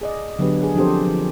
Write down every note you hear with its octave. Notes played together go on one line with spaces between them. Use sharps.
G#4 D5 D#5
D3 F#3 B3 D4 G4 B4
G#4
F3 C4 D4 G4 A4 C5
F3